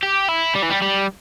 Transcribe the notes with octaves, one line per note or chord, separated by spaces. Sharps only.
G4
E4
G3
E3
G3
G3